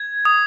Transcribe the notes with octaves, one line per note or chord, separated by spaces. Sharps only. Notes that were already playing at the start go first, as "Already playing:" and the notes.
Already playing: G#6
D#6